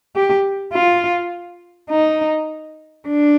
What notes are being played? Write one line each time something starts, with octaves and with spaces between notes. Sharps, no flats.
G4
F4
D#4
D4